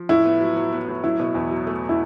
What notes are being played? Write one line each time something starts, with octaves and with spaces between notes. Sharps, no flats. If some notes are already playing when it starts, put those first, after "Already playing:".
Already playing: F3
A2 E4
B3
F#3
F#3
B3
A2
F#3 E4
B2
E2
F#3
A3
E4